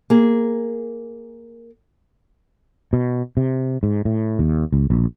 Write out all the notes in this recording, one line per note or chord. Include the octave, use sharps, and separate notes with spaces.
A#3 G#4
B2
C3
G#2
A2
D#2
C#2
A#1